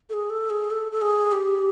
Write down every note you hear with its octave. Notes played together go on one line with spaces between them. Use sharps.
A4
G#4
A4
G#4
A4
A4
G#4
G4